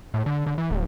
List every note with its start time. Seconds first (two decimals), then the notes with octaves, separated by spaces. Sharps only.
0.14 A2
0.26 D3
0.46 D3
0.58 E3
0.71 D1